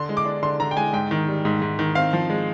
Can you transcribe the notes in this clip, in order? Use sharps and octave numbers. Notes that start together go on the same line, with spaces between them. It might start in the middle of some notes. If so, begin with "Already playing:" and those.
Already playing: D3 C6
G#3
D6
D4
D3 C6
D3 A#5
G5
G#3 G#5
G#2 G5
D#3
G3
G#2
G#2
D#3
C4 F5
F3
G#3